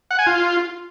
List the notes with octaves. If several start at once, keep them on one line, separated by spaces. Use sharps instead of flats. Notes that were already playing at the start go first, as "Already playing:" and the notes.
F#5
G#5
F4